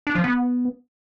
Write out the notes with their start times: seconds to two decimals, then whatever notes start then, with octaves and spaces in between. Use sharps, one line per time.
0.07 D4
0.15 F3
0.24 B3